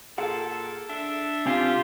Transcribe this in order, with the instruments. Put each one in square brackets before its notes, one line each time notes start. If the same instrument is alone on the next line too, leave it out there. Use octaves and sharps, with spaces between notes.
[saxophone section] A#2 A4 [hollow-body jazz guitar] G#4 F#5
[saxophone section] D4 A4 E5
[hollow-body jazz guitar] C2 C4 G#5 [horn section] F4 G4